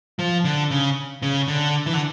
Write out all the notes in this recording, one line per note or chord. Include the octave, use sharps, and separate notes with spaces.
F3
D3
C#3
C#3
D3
E3
D3